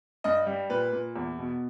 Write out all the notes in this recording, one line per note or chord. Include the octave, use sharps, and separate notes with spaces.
G2 D#5
G3
A#2 B4
A#2
E2
B2